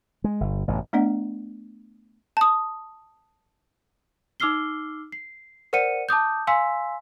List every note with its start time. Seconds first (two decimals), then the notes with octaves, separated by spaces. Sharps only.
0.24 G#3
0.41 G1
0.68 A1 G2 B2
0.93 A3 B3 D4 D5 D#5 F#5
2.37 A5 D#6
4.40 D#4 D6 E6 F6 C7 G7
5.12 C7
5.73 A#4 C5 D5 F#5 C#7 D#7
6.09 A5 D6 D#6 G6
6.47 F5 G#5 C6 E6 B6